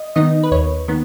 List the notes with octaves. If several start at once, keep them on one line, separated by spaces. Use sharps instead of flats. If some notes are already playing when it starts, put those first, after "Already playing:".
Already playing: D#5
D#3 B3 D#4 D#5
B4
D#2 C#5
D#3 B3